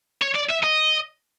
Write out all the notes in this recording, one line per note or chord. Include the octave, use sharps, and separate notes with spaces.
C#5
D5
E5
D#5